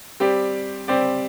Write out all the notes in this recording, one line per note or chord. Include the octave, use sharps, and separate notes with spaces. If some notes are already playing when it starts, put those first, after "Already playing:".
G3 C4 G4 D5
G3 C4 G4 D5